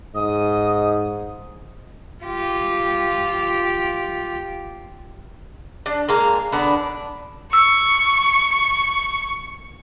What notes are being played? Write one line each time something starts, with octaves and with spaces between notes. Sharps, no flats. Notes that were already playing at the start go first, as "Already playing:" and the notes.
G#2 D#5 D#6
F4 G4
D4
G#3 A#3 A#5
D3 B3 D4
C#6 E6